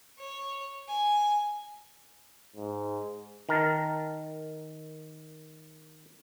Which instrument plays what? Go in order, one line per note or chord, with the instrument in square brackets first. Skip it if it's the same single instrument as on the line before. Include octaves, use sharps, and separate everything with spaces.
[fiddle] C#5
G#5
[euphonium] G#2
[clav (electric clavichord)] D#3 A#4 A5